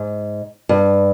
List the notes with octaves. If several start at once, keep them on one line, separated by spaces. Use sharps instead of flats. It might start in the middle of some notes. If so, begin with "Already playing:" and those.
Already playing: G#2
G2